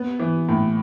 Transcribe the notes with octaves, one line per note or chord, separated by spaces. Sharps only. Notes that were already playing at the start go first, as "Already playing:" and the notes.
Already playing: B3
E3
A2